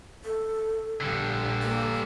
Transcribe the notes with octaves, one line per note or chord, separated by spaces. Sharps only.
A4
A#1 G2 A#2 D3
A#3